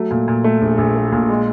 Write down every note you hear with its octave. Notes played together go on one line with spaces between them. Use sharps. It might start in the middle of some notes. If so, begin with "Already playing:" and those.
Already playing: F#3 A3
A#2
A#2
A3
A#1
A#1
A3
A#2
G#3